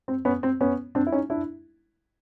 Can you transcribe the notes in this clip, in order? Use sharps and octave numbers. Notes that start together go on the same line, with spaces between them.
C4
B3 C#4
C4
B3 C#4
C4 D4
E4
C#4 D#4
D4 E4